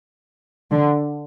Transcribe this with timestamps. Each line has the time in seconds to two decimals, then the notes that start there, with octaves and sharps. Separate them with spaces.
0.72 D3